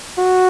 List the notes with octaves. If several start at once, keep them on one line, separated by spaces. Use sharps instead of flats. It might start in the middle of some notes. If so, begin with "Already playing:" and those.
F#4